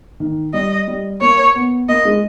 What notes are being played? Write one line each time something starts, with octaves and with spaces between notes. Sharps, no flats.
D#3
G3 D#5
G3
A#3 C#5
B3
A#3 D#5
G#3